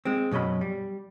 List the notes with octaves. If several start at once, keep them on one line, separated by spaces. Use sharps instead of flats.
G#3 C4
F#2 B2 F#3 D#5 B5
G3